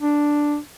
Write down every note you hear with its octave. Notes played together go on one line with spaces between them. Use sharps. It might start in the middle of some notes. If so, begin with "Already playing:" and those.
D4